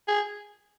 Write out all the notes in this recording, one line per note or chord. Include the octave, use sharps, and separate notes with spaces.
G#4